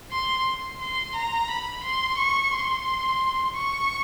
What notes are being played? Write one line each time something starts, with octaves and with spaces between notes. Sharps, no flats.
C6
C6
A#5
B5
C6
C#6
C6
C#6